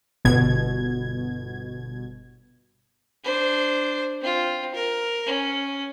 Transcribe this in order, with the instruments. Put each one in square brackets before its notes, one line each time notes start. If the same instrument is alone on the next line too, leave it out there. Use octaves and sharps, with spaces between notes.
[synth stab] G1 B2 G#6
[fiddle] D4 C5
C4 F4
A#4
C#4